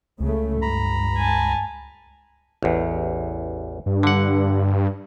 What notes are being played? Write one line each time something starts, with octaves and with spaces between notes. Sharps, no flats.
C#2 C#3 A3
G2 A#5 B5
G#5 A5
A1 E2
G2
D3 F#5